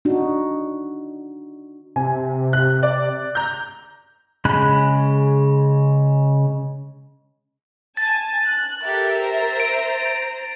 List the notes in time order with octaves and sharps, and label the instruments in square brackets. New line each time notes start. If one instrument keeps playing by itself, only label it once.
[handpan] D4 D#4 F#4
[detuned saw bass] C3 [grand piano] G#5
[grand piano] F#6
[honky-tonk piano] D5
A#5 G6
[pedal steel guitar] C#3 G#3 B5 F#6
[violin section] G#5 A5 [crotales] A6
[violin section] F#6
[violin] G4 A4 [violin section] A#4 E5
[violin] C5 A#5
[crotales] D7